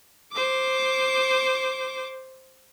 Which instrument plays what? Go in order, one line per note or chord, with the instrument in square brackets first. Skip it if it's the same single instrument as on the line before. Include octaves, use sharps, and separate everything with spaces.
[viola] C5 D6